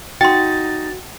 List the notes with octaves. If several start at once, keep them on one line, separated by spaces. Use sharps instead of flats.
D#4 F#4 G5 C6 A6